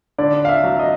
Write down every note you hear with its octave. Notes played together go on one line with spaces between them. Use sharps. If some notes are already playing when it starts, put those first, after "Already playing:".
D3 D5
F5
E5
F#3
D#5